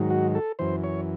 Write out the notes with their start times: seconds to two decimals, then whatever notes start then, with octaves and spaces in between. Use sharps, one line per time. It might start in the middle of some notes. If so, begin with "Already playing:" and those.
Already playing: G#2 D#3 F#3
0.10 F#4
0.35 A4
0.59 F#2 E3 C5
0.84 C#5